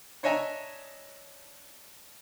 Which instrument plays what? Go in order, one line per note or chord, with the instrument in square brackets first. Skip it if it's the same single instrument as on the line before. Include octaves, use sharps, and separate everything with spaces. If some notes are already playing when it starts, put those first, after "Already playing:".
[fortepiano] D4 C#5 D#5 E5 G#5 A#5